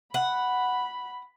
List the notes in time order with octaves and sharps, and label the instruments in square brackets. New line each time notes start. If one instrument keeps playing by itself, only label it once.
[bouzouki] F#5 [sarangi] B5